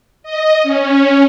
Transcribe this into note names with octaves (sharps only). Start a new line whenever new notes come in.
D#5
C#4